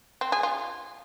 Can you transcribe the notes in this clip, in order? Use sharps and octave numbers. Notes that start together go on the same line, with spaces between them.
C4
G#4
F4